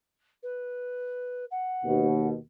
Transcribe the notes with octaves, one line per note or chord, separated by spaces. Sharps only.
B4
F#5
D#2 B2